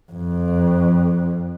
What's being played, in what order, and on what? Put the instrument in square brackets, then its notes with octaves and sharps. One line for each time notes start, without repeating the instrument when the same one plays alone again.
[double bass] F2